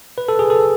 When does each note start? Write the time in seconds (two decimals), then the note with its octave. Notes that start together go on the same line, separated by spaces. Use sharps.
0.18 B4
0.29 A4
0.39 G#4
0.50 A4